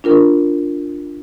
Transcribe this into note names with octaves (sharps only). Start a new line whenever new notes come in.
D4 F4 A#4